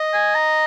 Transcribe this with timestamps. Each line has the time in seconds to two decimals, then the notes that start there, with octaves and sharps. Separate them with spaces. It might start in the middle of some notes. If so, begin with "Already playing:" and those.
Already playing: D#5
0.14 G#5
0.35 A#5